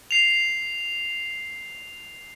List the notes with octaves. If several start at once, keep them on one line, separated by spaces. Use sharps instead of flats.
C7 F7